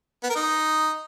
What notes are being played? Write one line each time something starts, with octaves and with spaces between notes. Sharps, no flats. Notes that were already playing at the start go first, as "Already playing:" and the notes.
B3
A#4
D#4